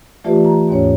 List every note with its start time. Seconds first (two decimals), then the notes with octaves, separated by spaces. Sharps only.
0.24 E3 A3 F4 G4 B4 D5
0.45 A#5
0.69 D#2 G#2 C#4 C#5